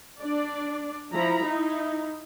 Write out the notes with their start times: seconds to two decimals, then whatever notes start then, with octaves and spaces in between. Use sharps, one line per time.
0.20 D4 D5
1.13 F3 E4 A#5 B5
1.44 D#4 E4